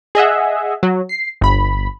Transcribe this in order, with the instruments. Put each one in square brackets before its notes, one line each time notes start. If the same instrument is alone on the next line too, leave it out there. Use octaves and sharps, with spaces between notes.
[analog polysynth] G#4 D#5 E5 F#5
F#3
C7
G1 B5